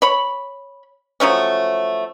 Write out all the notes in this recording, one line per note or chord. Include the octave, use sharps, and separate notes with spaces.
C#5 B5
F3 F#3 A3 C#4